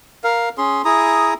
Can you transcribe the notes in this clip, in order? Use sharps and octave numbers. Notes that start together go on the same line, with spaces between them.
A#4 F5
C#4 G#4 C6
E4 G#4 A#5 D#6